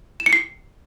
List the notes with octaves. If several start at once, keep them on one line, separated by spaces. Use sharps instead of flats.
E7
C#7
C7